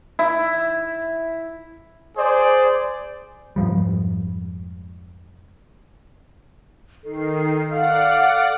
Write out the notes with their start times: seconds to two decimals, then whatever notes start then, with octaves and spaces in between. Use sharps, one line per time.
0.19 E4
2.17 G#4 C5 D5
3.56 F2 G#2 F3 G3
7.04 D#3 A4 C7
7.72 D5 F5 F#5